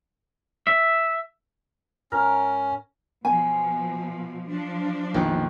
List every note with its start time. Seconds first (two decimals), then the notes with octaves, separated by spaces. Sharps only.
0.67 E5
2.12 G#2 C#4 A#4
3.25 B2 F3 G#5
4.49 F3 D4
5.14 A#1 F2 B2 D#3